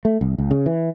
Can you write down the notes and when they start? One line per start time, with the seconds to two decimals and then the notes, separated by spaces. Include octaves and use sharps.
0.05 A3
0.21 C2
0.38 C#2
0.51 C#3
0.66 E3